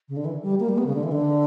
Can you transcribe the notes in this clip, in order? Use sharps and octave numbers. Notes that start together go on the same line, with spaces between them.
C#3
D3
E3
G3
A#3
G3
B3
C#3
D3
E3
D3